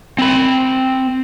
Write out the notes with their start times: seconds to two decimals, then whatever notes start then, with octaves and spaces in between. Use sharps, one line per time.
0.19 C4 B5